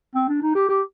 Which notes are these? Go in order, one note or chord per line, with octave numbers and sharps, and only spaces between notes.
C4
D4
D#4
G4
G4